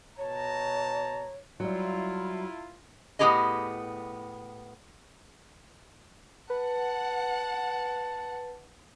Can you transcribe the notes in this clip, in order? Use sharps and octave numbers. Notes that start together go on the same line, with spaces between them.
B2 C#5 A5 A#5
F#3 G3 E4 F4 A#5
A2 B3 E4 G4 G#4 D#5
B4 F#5 A5